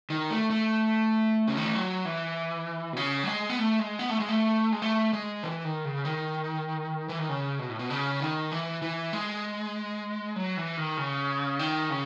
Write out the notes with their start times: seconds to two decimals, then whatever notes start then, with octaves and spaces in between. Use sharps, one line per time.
0.10 D#3
0.31 A3
0.51 A3
1.47 C#3
1.57 D#3
1.65 E3
1.74 F#3
2.05 E3
2.93 B2
2.97 C#3
3.23 F#3
3.27 G#3
3.50 B3
3.59 A3
3.79 G#3
3.99 B3
4.09 A3
4.20 G#3
4.29 A3
4.72 G#3
4.82 A3
5.13 G#3
5.43 E3
5.65 D#3
5.85 C#3
6.05 D#3
7.09 E3
7.19 D#3
7.29 C#3
7.59 B2
7.69 A2
7.79 B2
7.90 C#3
8.20 D#3
8.52 E3
8.82 E3
9.13 G#3
10.36 F#3
10.57 E3
10.77 D#3
10.97 C#3
11.59 D#3
11.90 C#3